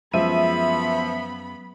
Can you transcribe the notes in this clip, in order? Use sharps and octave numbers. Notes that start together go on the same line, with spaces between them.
F#2 F3 G#3 B3 E5 B5 D#7